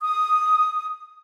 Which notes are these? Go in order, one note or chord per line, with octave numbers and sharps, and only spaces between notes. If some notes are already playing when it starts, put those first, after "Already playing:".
D#6